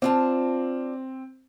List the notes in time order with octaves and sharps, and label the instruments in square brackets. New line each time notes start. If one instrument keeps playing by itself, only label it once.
[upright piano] C4 [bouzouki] D4 F4 A5